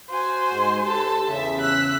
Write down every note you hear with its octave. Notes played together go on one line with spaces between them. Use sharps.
F#4 C5 G#5
G#2
G4 A4 A5
E2 C#3 E5
E6 F#6 B6